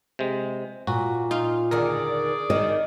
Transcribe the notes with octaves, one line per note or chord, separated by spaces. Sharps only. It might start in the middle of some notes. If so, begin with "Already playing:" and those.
C3 G#3
A#2 F#4
D#4 F4
D#2 D3 D#3 G#4 A#4 D5
D#3 D#5